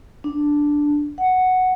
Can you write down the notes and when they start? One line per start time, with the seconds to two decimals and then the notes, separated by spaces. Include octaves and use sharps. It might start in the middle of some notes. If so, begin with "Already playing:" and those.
0.24 D4
1.18 F#5